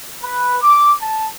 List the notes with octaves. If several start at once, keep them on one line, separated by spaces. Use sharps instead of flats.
B4
D6
A5